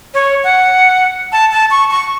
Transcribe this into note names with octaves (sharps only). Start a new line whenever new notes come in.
C#5
F#5
A5
A5
C#6
C#6